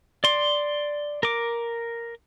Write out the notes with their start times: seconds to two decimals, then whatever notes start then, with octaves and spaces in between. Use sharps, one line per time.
0.24 D5 C6
1.23 A#4 D6